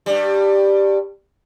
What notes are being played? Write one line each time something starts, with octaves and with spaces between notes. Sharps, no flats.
G2 G3